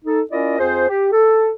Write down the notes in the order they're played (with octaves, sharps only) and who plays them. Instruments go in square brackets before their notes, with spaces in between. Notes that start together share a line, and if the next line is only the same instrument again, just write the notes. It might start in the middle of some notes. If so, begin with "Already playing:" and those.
[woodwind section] D#4 A4
C#4 E4 F4 A#4 D5 D#5
F2 F4 G#4 C5
G4
A4